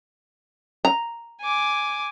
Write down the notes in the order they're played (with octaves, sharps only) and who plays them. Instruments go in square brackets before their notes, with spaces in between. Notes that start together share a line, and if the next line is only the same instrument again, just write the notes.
[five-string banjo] A#5
[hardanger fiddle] G#5 D6